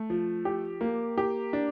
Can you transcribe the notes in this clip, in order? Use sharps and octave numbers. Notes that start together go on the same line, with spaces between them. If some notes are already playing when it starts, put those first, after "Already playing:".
Already playing: A3
F3
G4
A#3
G4
D4